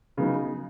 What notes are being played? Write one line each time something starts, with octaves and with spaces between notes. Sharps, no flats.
C#3 F#3 B3 D#4